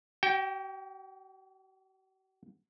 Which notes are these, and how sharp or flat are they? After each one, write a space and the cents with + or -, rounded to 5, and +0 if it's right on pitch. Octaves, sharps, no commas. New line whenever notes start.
F#4 +45 G5 +0